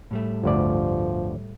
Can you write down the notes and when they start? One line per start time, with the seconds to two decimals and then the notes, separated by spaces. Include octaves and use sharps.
0.11 A2 G3 A3
0.44 G1 D2 F3 D5